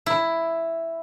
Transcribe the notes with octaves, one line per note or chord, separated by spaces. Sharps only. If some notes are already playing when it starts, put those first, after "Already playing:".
E4